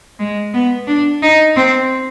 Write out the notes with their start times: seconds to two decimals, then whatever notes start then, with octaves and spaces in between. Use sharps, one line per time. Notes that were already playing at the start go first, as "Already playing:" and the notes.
0.19 G#3
0.54 B3
0.88 D4
1.22 D#4
1.57 C4